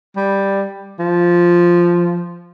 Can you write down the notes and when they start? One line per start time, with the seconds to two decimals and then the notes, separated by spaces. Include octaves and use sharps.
0.16 G3
0.99 F3